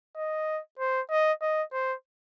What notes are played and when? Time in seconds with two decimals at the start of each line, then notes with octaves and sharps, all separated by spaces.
0.17 D#5
0.79 C5
1.10 D#5
1.41 D#5
1.72 C5